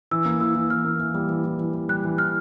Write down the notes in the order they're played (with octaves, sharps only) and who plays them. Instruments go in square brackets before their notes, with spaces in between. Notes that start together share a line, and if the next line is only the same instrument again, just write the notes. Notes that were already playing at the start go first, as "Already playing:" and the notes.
[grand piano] E3 [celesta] E6
[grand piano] A#3
[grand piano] E3 [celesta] E6
[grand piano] E3
[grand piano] E3 [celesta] F6
[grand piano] A#3
E3
G3
E3
E3
E3
E3
[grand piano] G3 [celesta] F#6
[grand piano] E3
[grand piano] E3 [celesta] F6